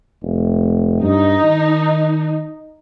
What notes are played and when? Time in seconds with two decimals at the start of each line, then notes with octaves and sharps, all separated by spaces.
0.23 F1
1.02 G2 D#4
1.44 D#3